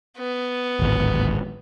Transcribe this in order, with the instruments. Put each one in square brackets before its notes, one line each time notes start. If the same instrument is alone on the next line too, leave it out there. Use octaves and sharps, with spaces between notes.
[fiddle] B3
[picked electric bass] D1 G#1